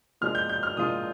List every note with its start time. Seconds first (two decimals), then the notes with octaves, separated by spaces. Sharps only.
0.21 A#2 F3 G#3 D4 F4 F6
0.35 G6
0.49 G6
0.63 F6
0.77 A#2 F3 G#3 D4 F4 D#6